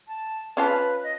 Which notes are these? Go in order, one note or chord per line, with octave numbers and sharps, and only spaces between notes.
A5
C#4 F4 B4 A5
D#5